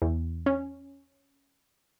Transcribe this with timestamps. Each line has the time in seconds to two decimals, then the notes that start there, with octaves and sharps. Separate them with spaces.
0.02 E2
0.46 C#4